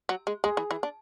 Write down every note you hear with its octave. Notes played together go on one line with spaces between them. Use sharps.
F#3
G#3
G#3 G#4
E3
E3
D4